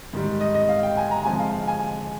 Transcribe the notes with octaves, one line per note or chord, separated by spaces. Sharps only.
G#2 D#3 G3
D#5
D#5
F5
G5
G#5
A#5
C3 F3 G#3 G#5
F5
F5
G#5